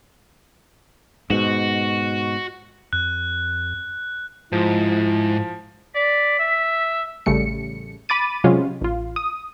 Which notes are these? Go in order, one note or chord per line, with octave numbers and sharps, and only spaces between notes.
G#2 B2 F#4
F2 F#6
G#2 F3 E4
D5 B6
E5
A1 C#3 G3 A3 C#7
B5 D6 A6 D#7
C3 F#3 G#3 C#4 F4
A1 F4
D#6